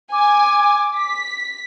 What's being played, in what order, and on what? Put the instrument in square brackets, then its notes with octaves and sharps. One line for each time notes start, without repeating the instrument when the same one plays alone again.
[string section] G#5 [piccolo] D6
[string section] B6